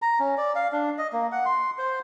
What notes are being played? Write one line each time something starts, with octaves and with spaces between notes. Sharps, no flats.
A#5
C#4
D5
F5
D4
D#5
A#3
F#5
C6
C5